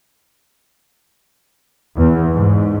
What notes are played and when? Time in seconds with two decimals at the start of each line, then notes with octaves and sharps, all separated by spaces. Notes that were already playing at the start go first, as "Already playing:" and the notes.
1.97 E2
2.34 G#2